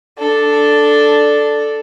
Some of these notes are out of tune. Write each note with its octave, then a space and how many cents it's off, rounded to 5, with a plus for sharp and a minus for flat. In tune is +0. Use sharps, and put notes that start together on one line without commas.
D4 +0 A4 +0